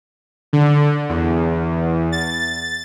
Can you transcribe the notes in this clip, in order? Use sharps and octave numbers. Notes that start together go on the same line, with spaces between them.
D3
E2
A6